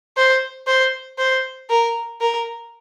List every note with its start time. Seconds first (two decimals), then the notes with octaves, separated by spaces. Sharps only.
0.17 C5
0.67 C5
1.18 C5
1.70 A#4
2.21 A#4